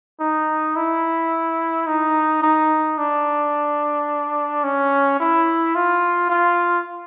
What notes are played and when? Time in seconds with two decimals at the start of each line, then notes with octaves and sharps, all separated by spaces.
0.20 D#4
0.76 E4
1.87 D#4
2.42 D#4
2.98 D4
4.64 C#4
5.19 E4
5.75 F4
6.30 F4